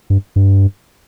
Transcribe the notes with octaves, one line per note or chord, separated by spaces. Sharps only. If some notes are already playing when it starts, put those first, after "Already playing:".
G2
G2